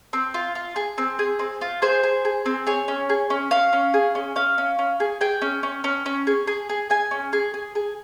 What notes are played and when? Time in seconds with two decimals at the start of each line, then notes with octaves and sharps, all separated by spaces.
0.13 C4
0.34 F4
0.55 F4
0.76 G#4
0.98 C4
1.19 G#4
1.39 C4
1.61 F4
1.82 G#4 C5
2.03 G#4
2.25 G#4
2.46 C4
2.67 G#4 C#5
2.88 C#4
3.10 G#4
3.30 C#4
3.51 C#4 F5
3.73 C#4
3.94 G#4
4.15 C#4
4.36 C#4 F5
4.58 C#4
4.79 C#4
5.00 G#4
5.21 G#4 G5
5.42 C#4
5.63 C#4
5.84 C#4
6.06 C#4
6.27 G#4
6.47 G#4
6.69 G#4
6.90 G#4 G#5
7.11 C#4
7.33 G#4
7.54 G#4
7.75 G#4